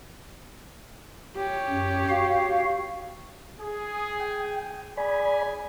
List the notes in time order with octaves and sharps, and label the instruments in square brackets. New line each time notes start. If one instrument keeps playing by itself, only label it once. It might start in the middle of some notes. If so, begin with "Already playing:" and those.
[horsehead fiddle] G4 C#5
[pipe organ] F#2
F#4 F5
[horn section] G#4
[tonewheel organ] G5
[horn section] G#4 G#5 [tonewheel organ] D5 B5